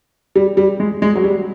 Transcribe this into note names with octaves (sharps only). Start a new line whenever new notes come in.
G3
G3
G#3
G#3
F#3
G3